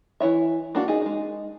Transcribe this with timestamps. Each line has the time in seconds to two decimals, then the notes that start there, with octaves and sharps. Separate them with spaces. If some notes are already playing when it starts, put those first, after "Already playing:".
0.20 E3 E4 C#5 E5
0.75 A#3 D4 F#4
0.88 D#4 G#4
1.02 G#3 D#4